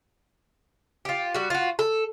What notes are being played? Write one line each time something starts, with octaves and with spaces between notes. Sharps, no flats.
F4 G4
G3 F#4
F4 F#4
A4